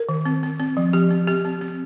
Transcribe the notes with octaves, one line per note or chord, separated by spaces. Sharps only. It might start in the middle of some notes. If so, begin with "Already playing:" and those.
Already playing: A#4
D#3
C4
C4
C4
F3
F3 G4
C4
C4 G4
C4
C4